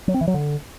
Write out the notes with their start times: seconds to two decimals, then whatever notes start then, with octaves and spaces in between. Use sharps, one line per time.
0.08 F#3
0.14 C4
0.21 E3
0.28 F#3
0.34 D3